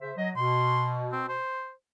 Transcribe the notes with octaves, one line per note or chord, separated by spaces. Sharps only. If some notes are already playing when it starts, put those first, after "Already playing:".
C#3 C5 E5
F#3 D#5
B2 C6
C4
C5